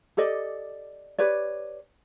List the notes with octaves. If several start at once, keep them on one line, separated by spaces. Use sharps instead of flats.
G4 A4 D5 D#5
G4 B4 C#5 D5